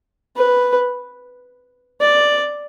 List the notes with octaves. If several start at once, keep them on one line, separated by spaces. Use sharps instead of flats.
B4
D5